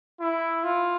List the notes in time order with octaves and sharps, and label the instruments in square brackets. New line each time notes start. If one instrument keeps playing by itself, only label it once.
[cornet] E4
F4